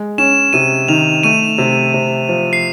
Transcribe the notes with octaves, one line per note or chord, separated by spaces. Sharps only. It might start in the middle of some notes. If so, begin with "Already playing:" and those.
Already playing: G#3
C#4 E7
C3 D#7
D#3 F7
A3 D#7
C3
C3
F3
C7